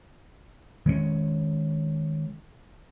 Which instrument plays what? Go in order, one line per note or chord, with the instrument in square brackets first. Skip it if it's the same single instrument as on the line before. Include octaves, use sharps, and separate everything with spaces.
[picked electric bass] D#3 G#3 A3 C#4